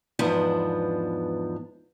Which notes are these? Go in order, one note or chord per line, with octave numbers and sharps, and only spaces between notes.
E2 G#2 F3 B3 D4